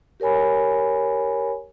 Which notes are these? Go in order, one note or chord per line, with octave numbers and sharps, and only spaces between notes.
G4 A#4 C#5 G#5 B5